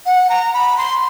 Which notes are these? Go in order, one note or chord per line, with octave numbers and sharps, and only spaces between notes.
F#5
A#5
B5
C6